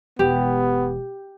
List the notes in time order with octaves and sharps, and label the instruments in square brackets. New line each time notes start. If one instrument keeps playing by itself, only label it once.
[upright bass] E1 [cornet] B3 [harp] G4